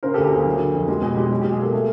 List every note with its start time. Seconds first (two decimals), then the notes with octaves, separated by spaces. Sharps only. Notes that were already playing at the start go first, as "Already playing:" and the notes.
0.03 C#3 A#4 C5
0.14 G4 A4
0.18 D2
0.24 G4
0.32 A#3 G#4
0.46 F#3
0.59 D3
0.74 F2
0.88 G#3 G4
1.02 B2 G#4
1.17 G#3 G4
1.30 F#3
1.41 B2 G4
1.52 G#4
1.59 A#3 G4 A4
1.74 A3